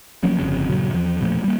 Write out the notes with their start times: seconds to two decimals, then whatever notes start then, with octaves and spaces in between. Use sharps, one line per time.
0.23 F3 F#3 A#3 C#4
0.38 G1 F2 C#3
0.70 G2 A#2 C#3 F#3
0.94 E2 F3
1.21 E1 A#2 F3 A3
1.44 G3 A#3